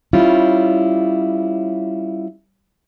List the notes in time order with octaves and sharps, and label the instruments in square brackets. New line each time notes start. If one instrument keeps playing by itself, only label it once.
[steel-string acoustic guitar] G3 C#4 E4 F4